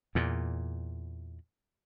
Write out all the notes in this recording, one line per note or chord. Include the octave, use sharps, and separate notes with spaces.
E2 A#2